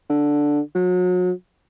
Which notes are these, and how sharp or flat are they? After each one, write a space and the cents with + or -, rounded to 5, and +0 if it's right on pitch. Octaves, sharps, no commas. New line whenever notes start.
D3 +0
F#3 -35